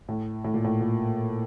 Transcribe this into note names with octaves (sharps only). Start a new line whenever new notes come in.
A2
A2
A#2
A2
A#2